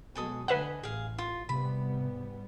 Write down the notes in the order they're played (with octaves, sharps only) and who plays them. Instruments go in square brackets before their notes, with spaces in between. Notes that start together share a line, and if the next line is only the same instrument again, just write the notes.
[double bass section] B2 F#3 G#3 [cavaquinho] G#4 A4 D#6
[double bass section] D3 A3 [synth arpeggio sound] B4 E5 F#5 [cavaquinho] D#5 G#5
[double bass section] A1 [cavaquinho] G#4 F5
[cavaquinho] F4
[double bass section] G#2 G3 B3 [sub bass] C3 [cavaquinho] B5